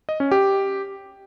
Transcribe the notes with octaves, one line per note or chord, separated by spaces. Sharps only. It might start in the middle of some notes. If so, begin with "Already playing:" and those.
D#5
C#4
G4